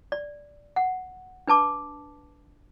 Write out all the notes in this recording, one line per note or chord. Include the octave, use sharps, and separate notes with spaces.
D5
F#5
D4 B4 A5 D6